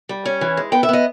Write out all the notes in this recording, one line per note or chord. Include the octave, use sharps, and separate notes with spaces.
G3
C#4
E3
G#3
B3 G5
E5
B3 D#5